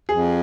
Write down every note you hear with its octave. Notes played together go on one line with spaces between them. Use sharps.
F2 G#4